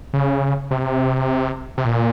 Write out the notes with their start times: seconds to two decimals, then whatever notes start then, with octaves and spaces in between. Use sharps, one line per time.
0.13 C#3
0.71 C3
1.78 C3
1.85 A#2